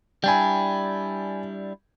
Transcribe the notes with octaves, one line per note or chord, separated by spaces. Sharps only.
G3 D4 E4 G5 G#5